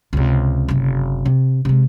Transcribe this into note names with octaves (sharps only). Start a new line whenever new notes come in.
C#2 C3
F#1 C3
C3
C3 G#3